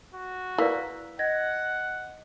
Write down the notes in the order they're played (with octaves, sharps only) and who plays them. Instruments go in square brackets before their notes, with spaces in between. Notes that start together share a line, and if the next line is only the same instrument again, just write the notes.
[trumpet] F#4
[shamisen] A#3 [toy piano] E4 B4 D5 [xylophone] E6 B6
[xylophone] D#5 G#6 A#6 [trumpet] F#5